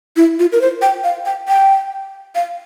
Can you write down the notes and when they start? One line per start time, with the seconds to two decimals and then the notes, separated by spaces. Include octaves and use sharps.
0.16 E4
0.39 F4
0.52 A#4
0.61 C5
0.82 G5
1.04 F5
1.25 G5
1.48 G5
2.35 F5